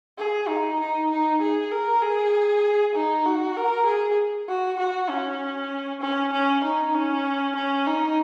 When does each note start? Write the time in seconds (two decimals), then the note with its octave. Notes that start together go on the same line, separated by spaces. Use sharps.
0.18 G#4
0.48 D#4
0.80 D#4
1.10 D#4
1.42 G#4
1.72 A#4
2.02 G#4
2.95 D#4
3.26 F#4
3.57 A#4
3.86 G#4
4.49 F#4
4.80 F#4
5.09 C#4
6.01 C#4
6.32 C#4
6.64 D#4
6.95 C#4
7.56 C#4
7.87 D#4